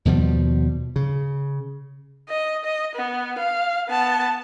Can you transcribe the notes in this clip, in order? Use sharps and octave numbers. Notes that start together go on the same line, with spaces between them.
D#2 B2 F3 G3
C#3
D#5
D#5
B3
F5
B3 A5